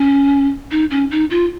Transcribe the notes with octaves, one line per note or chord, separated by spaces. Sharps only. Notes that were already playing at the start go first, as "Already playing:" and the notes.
Already playing: C#4
D#4
C#4
D#4
F4